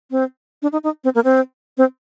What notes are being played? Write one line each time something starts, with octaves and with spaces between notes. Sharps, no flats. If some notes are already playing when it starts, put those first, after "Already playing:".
C4
D4
D#4
D#4
C4
A#3
C4
C4